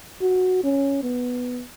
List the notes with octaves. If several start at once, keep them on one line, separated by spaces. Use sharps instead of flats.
F#4
C#4
B3